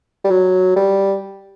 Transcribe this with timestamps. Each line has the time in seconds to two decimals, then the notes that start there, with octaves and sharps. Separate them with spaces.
0.24 G3
0.30 F#3
0.76 G3